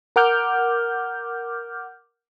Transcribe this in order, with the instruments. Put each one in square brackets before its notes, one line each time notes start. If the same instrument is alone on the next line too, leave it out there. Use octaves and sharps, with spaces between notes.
[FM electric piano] A#4 F#5 D6 F6 G6